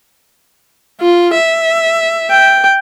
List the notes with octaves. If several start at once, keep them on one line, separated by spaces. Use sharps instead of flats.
F4
E5
G5